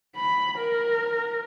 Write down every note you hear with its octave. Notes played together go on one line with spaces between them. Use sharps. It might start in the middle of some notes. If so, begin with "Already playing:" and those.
B5
A#4